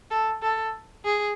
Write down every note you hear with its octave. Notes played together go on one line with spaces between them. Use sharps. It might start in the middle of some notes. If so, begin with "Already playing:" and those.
A4
A4
G#4